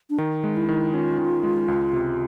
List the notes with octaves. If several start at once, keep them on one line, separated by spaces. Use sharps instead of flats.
D4
D#3 D#4
G#3
E4
D#3
C#4 F4
D#3
G#3
C#2
C3